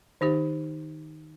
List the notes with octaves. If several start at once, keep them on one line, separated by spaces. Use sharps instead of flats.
D#3 D#4 G4 C5